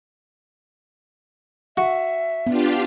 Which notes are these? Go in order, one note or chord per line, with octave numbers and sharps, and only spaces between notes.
F#4 E5
B3 D4 F4 G4